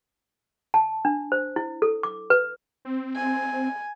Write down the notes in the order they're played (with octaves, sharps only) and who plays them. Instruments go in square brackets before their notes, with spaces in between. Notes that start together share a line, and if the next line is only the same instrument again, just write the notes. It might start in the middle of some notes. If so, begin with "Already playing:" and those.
[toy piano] A5
D4
C5
E4
A4
D6
B4
[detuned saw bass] C4
[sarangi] G#5